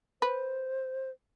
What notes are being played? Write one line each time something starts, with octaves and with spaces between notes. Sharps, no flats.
B4 C5